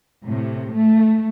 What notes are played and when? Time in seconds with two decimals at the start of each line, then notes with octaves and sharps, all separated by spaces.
0.25 A2 C3
0.74 A3